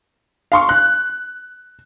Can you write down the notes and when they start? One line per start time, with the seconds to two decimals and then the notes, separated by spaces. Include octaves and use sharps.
0.52 F5 C6 C#6
0.69 F#6